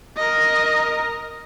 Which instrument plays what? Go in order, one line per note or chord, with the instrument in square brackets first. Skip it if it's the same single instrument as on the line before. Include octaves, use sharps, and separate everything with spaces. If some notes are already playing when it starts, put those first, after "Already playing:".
[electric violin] A#4 D#5